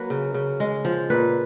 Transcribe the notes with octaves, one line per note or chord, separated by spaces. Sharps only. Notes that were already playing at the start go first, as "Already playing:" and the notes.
Already playing: F#3 A#3 B4
C#3
C#3
G#3
F3
A#2 B4